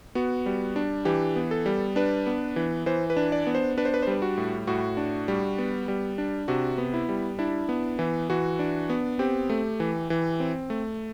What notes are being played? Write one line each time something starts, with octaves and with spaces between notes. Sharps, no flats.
B3 F#4
G3
D4
E3 G4
B3
A4
G3
D4 B4
B3
E3
E3 C5
B4
D4
D5
B3
C5
D4 B4
C5
B4
C5
G3 B4
F#4
A2
A2 F#4
D4
G3
B3
G3
D4
C3 F#4
B3
E4
G3
D4 E4
B3
E3
E3 F#4
D4
B3
C4 G4
A3
E3
E3
C4
A3